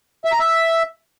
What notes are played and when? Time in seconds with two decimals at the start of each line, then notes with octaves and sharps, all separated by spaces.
0.25 E5
0.32 A#5
0.40 E5